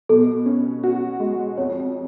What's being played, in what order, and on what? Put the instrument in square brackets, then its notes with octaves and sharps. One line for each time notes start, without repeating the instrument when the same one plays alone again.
[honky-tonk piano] B2 [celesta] A4
[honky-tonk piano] C#4
F#4
G#3
[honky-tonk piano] F2 [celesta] C#5